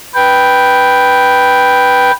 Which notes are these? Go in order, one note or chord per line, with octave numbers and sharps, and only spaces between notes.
B4 G5